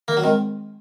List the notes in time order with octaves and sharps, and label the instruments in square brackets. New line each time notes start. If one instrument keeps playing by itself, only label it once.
[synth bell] D#3 [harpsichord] A#3
[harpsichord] F#3
[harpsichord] D#3 [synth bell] G#3 C4